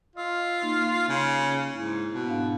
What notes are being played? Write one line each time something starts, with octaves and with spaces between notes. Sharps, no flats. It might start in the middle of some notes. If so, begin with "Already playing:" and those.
F4 D#5 E6
A#3 D#4
C#3
G#2 E4
B2
G#2 D4 F5